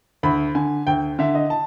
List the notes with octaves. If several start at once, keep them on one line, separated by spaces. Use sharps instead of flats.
D2 B5
D3 G#5
D2 G5
D3 E5
D#5
A5